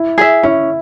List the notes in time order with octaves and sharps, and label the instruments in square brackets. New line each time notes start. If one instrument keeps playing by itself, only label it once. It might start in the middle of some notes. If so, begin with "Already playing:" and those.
Already playing: [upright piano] E4
[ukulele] G#4 E5
[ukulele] C#4 [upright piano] E4